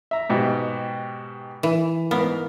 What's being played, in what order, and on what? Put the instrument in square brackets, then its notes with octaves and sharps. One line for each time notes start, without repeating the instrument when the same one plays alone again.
[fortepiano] E5 A#5
G#2 B2 G4
[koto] E3
[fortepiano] G#2 A#4 F5 [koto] B3